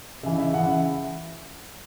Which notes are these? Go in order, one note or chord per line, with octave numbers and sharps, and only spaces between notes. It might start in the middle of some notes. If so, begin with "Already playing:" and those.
C#3 E3 E5
E5
C#3 E3 F#5
E5